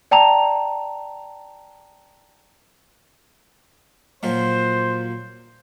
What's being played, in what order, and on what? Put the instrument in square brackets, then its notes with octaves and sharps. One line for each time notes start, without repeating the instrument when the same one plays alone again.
[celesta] D5 G5 A5 A#5 F7
[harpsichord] A#2 F3 F#3 [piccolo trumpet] C5